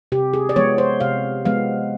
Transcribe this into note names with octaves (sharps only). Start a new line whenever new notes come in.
C3 G4
G#4
D5
F3 G#3 B3 C#5
C5
C3 F5
F3 G#3 B3 F5